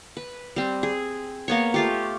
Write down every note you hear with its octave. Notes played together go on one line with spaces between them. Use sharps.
B4
G3 C4
G#4
A#3 B3 C#5
A3 F4 G4